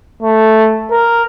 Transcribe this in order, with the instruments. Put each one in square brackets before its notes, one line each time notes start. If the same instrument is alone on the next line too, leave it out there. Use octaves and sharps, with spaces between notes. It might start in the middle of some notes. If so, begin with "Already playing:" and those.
[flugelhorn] A3
A#4